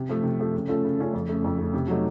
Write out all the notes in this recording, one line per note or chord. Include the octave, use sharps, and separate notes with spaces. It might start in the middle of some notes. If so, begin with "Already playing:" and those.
Already playing: C3
F3 A3
C3
F3 A3
C#3
A3 C#4 F4 A4
C#3
A3 C#4 F4 A4
F2
C#3 A3
F2
C#3 A3
C3
F#3 A3 D#4